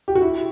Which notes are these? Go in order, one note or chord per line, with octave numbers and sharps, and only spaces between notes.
G4
F#4
E4